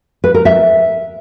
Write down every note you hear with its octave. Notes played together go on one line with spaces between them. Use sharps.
B4
A#4
E5